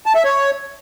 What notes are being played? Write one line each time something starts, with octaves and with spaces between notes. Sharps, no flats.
A5
E5
C#5